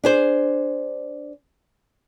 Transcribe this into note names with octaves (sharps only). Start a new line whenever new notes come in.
D4 G#4 C5